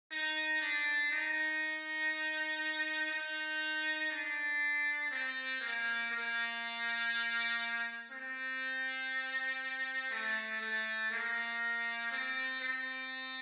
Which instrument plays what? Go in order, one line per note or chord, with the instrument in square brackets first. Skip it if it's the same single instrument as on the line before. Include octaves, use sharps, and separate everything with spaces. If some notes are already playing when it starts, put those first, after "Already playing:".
[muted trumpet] D#4
D4
D#4
D#4
D4
C4
A#3
A#3
C4
A3
A3
A#3
C4
C4